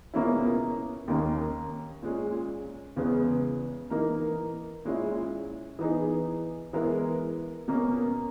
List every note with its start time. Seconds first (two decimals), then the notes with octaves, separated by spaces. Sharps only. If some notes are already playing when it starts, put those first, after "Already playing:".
0.14 C#2 B2 A#3 C#4 E4
1.08 D#2 D#3 A#3 C#4
2.02 A#2 G#3 C#4
2.96 E2 C#3 G#3 B3
3.90 E3 A#3 D#4 A#4
4.85 A#2 G#3 C#4 E4
5.79 E3 B3 D#4 G#4
6.73 E3 G#3 B3 E4 A#4
7.68 B2 A#3 C#4